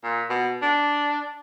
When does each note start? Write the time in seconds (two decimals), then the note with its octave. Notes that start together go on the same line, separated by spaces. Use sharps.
0.04 A#2
0.30 B2
0.62 D4